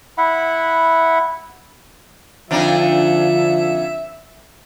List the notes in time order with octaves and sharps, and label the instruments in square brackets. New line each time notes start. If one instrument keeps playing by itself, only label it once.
[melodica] E4 E5 F#5 B5
[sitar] F2 D4 D#4 [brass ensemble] D3 F3 [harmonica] E5